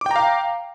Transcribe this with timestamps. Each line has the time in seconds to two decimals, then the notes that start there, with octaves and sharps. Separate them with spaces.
0.01 D6
0.06 G5
0.11 A#5
0.16 F5